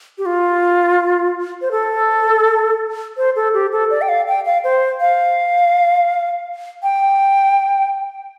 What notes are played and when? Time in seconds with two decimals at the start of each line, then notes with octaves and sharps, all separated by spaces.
0.18 G4
0.26 F4
1.62 C5
1.71 A4
3.17 C5
3.36 A4
3.54 G4
3.72 A4
3.91 D5
4.02 G5
4.09 F5
4.28 G5
4.45 F5
4.64 C5
5.01 F5
6.83 G5